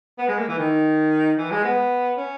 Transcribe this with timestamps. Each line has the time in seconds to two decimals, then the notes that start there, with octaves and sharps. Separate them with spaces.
0.18 B3
0.28 G#3
0.38 A#3
0.49 E3
0.58 D#3
1.38 E3
1.51 G#3
1.65 B3
2.17 C#4